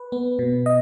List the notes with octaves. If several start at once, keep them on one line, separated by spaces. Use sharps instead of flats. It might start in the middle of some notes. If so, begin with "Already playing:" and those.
Already playing: B4
B3
B2
D#5